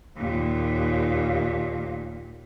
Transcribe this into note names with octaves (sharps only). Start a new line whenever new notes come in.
D#2 A#2